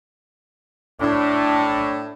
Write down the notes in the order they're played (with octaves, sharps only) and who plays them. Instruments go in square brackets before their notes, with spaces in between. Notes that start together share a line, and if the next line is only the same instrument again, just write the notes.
[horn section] A2 [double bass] D4